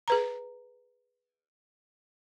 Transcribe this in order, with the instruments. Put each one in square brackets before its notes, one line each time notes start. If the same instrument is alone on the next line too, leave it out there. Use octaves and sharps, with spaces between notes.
[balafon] G#4 B4 A#5